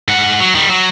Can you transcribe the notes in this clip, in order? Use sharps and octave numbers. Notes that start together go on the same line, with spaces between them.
G#2 F#5
F#3
D#3 G3
F#3